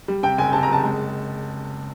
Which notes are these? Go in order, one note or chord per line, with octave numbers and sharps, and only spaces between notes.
G3
C3 G5
F#1 G#5
C3 A5
A#5
F#1 A5
G#3